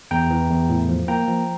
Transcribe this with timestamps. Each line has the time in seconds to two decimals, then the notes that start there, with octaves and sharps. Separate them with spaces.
0.11 E2 G5 A#5
0.30 E3
0.50 E2
0.70 A2
0.89 F3
1.08 A#3 G5 A#5
1.27 F3